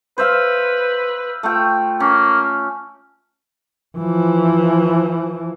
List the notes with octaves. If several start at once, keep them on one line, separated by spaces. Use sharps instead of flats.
B4 C5 E5 F5
A3 F4 G5
A#3 C#4
E3 F3